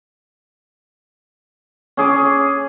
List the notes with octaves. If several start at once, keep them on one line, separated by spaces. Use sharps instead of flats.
C#4 G#4 D6